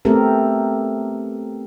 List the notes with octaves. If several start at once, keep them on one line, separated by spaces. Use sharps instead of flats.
A3 B3 C4 G4 A4 A#4